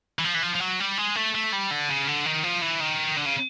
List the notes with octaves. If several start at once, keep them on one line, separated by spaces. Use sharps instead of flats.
E3
F3
E3
F3
F3
F#3
G3
G#3
A3
A3
G3
D3
C#3
D3
D#3
F3
E3
D#3
D3
C#3